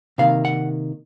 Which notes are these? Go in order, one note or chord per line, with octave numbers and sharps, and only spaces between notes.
C3 D#3 A#3 F5
F#5